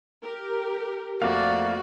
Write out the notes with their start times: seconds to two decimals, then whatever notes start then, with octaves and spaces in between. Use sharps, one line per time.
0.22 G4 A#4
1.22 F2 A3 A#3 F#4 D5 F5